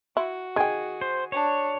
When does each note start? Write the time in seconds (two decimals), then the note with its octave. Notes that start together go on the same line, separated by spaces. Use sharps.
0.17 E4 F#4
0.56 D#3 G#4 G5 G#5
1.01 C5
1.32 D4 C#5